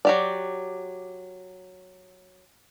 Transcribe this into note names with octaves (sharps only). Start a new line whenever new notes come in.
F#3 G4 D5